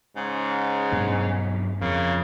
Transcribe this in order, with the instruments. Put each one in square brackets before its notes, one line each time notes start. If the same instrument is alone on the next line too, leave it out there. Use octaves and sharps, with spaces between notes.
[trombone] G#2 [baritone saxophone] C#3
[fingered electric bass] B1 G2 B3
[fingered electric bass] F2 [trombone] C#3 [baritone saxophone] A#3